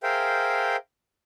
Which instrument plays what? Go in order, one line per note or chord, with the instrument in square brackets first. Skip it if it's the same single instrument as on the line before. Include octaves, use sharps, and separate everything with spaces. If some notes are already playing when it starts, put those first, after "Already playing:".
[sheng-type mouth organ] G#4 A#4 C5 E5 F5 G5